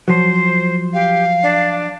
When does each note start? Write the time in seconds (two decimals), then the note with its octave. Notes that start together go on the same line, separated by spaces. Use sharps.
0.08 F3 F#3 C5
0.93 G4 F5
1.43 D4